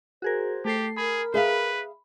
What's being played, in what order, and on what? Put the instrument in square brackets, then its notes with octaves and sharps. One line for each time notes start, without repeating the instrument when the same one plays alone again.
[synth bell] F#4 G#4 A#4 [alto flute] C5
[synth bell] A3 A4 C7 [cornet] G4
[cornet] G#4 [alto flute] A#4 [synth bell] B5
[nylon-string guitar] G#4 E5 F5 [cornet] B4